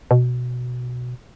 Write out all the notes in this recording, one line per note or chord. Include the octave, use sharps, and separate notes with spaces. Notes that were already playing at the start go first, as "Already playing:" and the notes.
B2